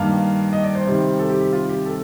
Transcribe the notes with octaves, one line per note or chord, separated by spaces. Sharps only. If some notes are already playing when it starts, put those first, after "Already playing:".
Already playing: G2 D#3 A#3 D4 F5
D#5
D5
C5
C3 D#3 G3 C4
A4
G4
G4
F4
G4
A4